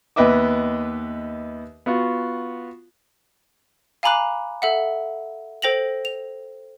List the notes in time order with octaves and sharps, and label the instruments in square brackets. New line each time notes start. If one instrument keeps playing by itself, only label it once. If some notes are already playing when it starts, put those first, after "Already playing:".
[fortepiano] D#2 B3 B4 D#5 E5 D6
B3 F4 F#4
[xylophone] F5 G#5 A#5 B5 D6 F#6
A4 E5 F#5
A4 C5 G5 A#6 F7 F#7
F7